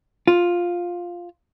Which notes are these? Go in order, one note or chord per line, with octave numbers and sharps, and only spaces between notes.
F4